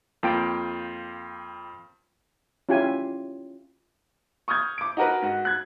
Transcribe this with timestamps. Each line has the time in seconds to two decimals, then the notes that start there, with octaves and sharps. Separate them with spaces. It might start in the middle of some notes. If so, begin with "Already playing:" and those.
0.23 F2 A#3 F4 G5 D7
2.69 C#4 E4 F4 G4 G#5
4.48 C#6 D#6 F6 G6 G#6
4.78 D6 D7
4.97 D#4 F#4 A#4 B4
5.22 G#2 F#4
5.45 F#6 G#6